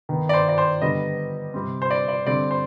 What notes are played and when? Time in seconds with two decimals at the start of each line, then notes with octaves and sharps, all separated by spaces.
0.09 D#3 B3
0.29 D5
0.33 C5
0.49 D5
0.58 C5
0.82 D3 G3 B3 D#5
1.54 C3 G3 C4
1.82 C5
1.90 D5
2.08 D5
2.26 D3 G3 C4 D5
2.51 C5